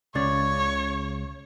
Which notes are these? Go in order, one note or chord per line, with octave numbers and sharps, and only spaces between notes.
C#2 C#3 C#5 D5